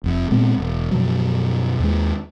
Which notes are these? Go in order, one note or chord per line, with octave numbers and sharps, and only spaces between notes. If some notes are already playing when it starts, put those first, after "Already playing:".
F1 F2
A#2 G#3 B3 C4
E1
F#2 B2 F3 F#3
D#2 G#3